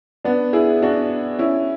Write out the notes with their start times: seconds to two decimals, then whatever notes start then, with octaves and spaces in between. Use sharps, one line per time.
0.25 B3 D4
0.53 E4 G#4
0.82 D4 F#4
1.39 C#4 E4